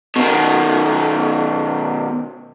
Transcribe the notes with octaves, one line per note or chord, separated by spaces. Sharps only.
B2 D#3